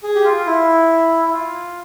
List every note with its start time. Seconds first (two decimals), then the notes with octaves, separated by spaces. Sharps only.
0.03 G#4
0.15 G4
0.24 F4
0.46 E4
1.25 E4
1.32 F4